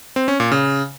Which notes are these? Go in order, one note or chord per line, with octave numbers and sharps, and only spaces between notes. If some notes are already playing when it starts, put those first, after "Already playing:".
C4
C#4
A#2
C#3